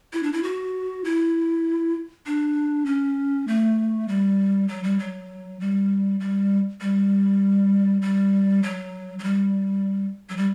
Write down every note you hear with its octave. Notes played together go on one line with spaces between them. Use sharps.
E4
D4
E4
F#4
E4
D4
C#4
A3
G3
F#3
G3
F#3
G3
G3
G3
G3
F#3
F#3
G3
F#3
G3